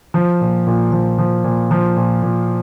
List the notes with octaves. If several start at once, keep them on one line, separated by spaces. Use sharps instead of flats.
F3
A#2
A#2
F3
F3
A#2
F3
A#2
A#2